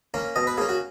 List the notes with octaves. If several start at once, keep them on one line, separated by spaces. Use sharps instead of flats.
A#3 C#4
B2 D#5
B4
A#3 C#4 G#4
F#4